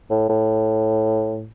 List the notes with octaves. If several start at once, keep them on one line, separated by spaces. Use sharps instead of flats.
A2
A2